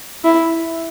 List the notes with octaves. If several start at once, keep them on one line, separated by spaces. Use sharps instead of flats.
E4